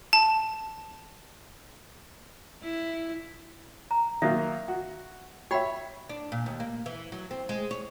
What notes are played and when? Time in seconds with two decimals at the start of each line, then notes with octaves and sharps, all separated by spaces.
0.13 A5
2.63 E4
3.91 A#5
4.22 D#3 F#3 A#3 E5
4.68 F#4
5.51 F#4 C#5 E5 G5 B5
6.09 D4
6.32 A#2
6.46 D#2
6.60 A#3
6.86 E3
7.12 F#3
7.31 C4
7.49 G#3
7.71 C#5